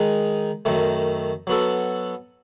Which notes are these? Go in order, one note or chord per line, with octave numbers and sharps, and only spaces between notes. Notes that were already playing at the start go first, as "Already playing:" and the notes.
Already playing: D#3 G#3 D#4 G#4
F#2 D#3 A3
F#3 B3 F#4 A4